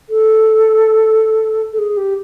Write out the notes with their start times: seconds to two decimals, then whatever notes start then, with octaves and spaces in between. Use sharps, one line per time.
0.09 A4
1.73 A4
1.79 G#4
1.97 G4